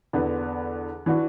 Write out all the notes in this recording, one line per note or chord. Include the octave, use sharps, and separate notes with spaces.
E2 D3 B3
E3 D4 F#4